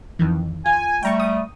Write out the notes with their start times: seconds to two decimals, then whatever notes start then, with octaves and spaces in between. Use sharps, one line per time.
0.19 F2 D#3 E3
0.66 F4 G#5
1.03 G3 A3 G5 A#5 C#6
1.20 D#6